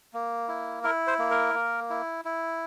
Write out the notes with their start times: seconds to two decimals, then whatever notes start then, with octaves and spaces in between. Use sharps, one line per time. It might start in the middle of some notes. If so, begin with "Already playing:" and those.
0.13 A#3
0.48 E4
0.84 E4 A#4
1.07 C5
1.19 A#3
1.31 A#4
1.54 A#3
1.90 E4
2.25 E4